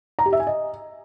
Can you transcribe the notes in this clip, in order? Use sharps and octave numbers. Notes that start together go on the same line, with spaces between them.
A#5
G4
E5
G#5
D#5